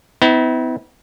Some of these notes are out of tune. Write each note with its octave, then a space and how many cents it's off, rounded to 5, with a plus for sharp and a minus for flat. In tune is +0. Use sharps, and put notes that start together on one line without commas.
B3 +45 E4 -35